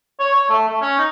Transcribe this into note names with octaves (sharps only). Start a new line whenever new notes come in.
C#5
C#5
A3
A3
C#4
D#4